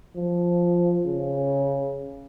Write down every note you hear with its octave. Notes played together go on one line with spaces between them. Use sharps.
F3
C#3